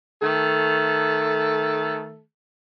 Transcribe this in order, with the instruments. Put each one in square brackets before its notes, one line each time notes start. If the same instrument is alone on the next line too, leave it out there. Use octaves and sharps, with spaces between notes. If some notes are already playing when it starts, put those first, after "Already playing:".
[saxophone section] D#3 A3 A4